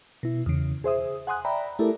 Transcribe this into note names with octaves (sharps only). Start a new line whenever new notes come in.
B2 E4
E2 C#3
G#4 C5 E5 D#6
F#5 G#5 C6 D#6 F#6
D5 E5 G5 A#5 B5
A3 E4 G4 A4 A#4 D5